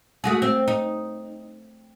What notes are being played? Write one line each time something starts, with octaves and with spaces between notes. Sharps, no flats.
A3 F#4 G#4
C4
D#4